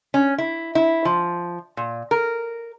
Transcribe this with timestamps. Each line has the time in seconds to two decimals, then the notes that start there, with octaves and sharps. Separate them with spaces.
0.14 C#4
0.38 E4
0.75 E4
1.05 F3
1.77 A#2
2.11 A#4